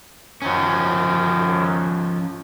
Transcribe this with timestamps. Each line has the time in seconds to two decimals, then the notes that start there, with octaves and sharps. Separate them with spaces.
0.42 F#2 D#3 F3 C#4